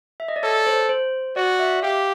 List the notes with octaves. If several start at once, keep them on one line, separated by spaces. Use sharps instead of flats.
E5
D#5
D5
A4 C#5
C5
C5
F#4 D5
E5
G4 F5